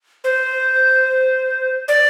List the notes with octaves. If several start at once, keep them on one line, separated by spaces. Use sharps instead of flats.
C5
D5